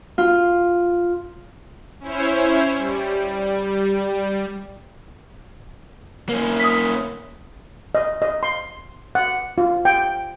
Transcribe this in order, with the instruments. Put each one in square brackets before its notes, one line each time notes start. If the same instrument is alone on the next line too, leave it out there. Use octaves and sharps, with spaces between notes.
[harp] F4
[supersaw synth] C#4 E4 C5 C#5
G3
[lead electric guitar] A#3 C#4
[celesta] D#6 B6
[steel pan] D#5
D#5
C6
F#5
F4
G5